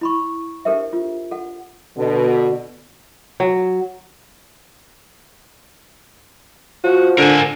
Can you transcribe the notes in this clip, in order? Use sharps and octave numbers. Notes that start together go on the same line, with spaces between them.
E4 B5 C#6
D4 G4 A4 A#4 C5 E5
F4
A4 F#5
B2 D3
F#3
F3 F#4
D3 A#4 G#5